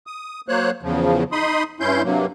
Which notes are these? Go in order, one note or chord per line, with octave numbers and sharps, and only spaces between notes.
D#6
F#3 A#3 C5 C#5 F#6
E2 C#3 F3
D#4 B5 C6 D#6
G2 C#4 E4 C6 G6
G2 C3 F#3 A#3